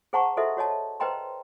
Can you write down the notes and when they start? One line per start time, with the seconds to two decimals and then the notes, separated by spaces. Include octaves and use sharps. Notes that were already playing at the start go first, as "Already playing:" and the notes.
0.13 G#4 C5 F#5 A5 A#5 C#6
0.37 F#4 A4 C5 D#5 E5
0.57 F#4 C#5 D#5 A5
1.00 B4 C5 D#5 G5 A#5 C6